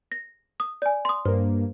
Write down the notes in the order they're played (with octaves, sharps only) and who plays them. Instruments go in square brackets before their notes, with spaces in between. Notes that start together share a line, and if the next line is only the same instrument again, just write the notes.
[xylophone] A#6
D#6
D5 G#5
C6 D#6
[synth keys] G2 A#3 [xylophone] C5